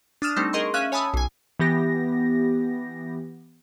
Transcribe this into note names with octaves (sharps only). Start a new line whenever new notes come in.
D4 D#6 F6 E7
G3 A3 C4 D4 D#4
G#4 A#4 D#5 C6 C#6
C#4 E5 F5 F#6 D#7
C#5 G#5 A5 B5 D#6 E6
B1 G#5
E3 B3 G4 A#6